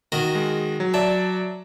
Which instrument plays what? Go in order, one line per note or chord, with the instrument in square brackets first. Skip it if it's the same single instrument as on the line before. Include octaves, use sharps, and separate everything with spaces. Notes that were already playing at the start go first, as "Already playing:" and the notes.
[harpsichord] D#3 F#4 A#4
[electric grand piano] G#3
F#3
[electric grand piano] F#3 D5 A5 [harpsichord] E5